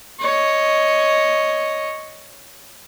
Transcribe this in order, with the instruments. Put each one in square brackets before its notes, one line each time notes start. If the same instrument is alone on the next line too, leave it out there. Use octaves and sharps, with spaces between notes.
[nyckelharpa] C#5 D#5